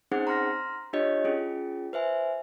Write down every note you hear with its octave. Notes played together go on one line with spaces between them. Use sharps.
C4 C#4 D#4 G#4 C5 F#5
A#5 C6 F6 A#6
D4 F4 G4 C#5 D#5
C#4 F4 G#4
B4 C5 E5 G#5